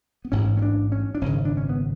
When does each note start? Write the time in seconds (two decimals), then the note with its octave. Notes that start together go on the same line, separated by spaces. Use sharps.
0.25 B3
0.32 A1 G#2 C#4
0.57 C#4
0.62 D4
0.92 C#4
1.15 D4
1.21 G#1 F#2 C#3 C#4
1.45 D4
1.57 C#4
1.69 B3